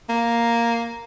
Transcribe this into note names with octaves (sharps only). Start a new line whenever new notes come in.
A#3